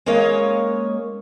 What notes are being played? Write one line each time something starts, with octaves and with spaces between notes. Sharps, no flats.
G#3 A#3 C#4 C#5 D#5 F5